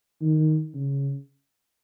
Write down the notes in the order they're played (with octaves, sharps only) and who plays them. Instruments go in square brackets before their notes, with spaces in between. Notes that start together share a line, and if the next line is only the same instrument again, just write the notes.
[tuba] D#3
C#3